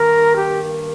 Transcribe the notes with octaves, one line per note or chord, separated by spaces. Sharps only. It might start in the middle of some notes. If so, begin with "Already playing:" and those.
Already playing: G2 D#3 A#3 A#4
G4